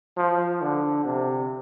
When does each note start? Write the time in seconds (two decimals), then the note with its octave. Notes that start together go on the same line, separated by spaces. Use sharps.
0.17 F3
0.62 D3
1.05 C3